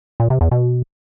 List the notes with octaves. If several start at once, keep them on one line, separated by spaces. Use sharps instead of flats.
A#2
C3
E2
B2